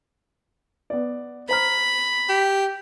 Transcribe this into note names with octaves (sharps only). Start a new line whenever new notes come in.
B3 D5
C5 A#5 B5 F6
G4